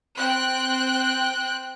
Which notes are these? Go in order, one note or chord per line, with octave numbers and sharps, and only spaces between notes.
C4 G5 F#6